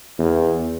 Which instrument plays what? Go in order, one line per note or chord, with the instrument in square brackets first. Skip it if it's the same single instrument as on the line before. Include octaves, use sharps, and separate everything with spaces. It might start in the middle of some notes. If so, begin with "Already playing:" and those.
[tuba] E2